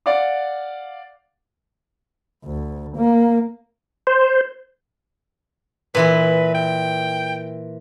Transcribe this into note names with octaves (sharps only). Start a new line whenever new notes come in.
D5 F5 F#5 D6
D2
A#3
C5
A#2 E3 E4 B4
G5